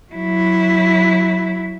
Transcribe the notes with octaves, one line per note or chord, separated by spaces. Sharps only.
F#3 E4